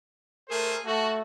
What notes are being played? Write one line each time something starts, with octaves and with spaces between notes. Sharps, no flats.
A3 G#4 A#4 C5
A3 F#4 A5